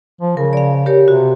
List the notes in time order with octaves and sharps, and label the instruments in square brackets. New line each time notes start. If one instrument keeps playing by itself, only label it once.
[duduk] F3
[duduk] C#3 [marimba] A#4
[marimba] D5 F5
G4 A#4 C#5
[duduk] C3 [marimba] F#4